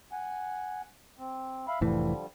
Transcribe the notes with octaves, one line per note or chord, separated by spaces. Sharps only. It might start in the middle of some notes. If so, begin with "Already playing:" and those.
F#5 G#5
C4
E5 F5 B5
F1 A2 D3 E3 F3 G3